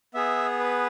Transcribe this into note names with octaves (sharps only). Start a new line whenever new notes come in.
B3 G#4 E5
B4